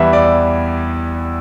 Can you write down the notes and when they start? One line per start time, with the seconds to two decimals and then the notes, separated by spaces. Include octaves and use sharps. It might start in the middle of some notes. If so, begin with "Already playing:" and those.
Already playing: E2 E3 G3 B4 E5
0.13 D5